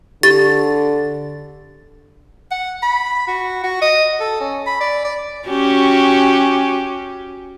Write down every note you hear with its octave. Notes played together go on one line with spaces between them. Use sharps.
D3 G4 A6
F#5
B5
F#4
F#4
D#5
A4
C#4
B5
D5
D5
C#4 F#4 G4